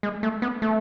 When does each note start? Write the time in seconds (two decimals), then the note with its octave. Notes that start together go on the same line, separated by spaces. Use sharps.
0.03 G#3
0.23 A3
0.42 B3
0.62 A3